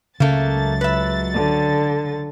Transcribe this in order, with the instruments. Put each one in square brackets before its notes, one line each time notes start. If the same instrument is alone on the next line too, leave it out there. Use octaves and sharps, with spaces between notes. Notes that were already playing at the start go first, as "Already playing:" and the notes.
[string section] C#2 F#3 A6 [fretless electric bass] C#3 [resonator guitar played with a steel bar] A3 A#3
[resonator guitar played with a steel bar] B4 E5
[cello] D3